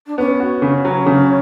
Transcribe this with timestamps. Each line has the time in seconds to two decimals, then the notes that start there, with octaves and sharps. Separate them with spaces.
0.07 D4
0.18 B3 C#4
0.40 F#4
0.62 C#3
0.85 F#3
1.06 C#3